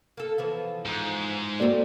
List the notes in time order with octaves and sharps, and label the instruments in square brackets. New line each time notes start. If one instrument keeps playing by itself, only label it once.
[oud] A#3 A4
E3 F3 B3
[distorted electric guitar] G#2
[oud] A3 C4 [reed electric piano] A#3 F#4 D5